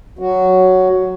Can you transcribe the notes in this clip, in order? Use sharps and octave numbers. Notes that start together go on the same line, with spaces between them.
F#3 F#4